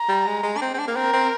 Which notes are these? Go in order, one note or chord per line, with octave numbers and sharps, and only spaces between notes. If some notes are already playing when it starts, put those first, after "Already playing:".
Already playing: A#5
G3
G#3
G#3
D4
C4
C4
D4
A#3
C4 A#4
C4